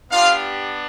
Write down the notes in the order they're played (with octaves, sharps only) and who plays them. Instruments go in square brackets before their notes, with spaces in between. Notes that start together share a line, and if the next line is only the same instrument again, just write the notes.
[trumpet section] B3 D4 F4 G4 F5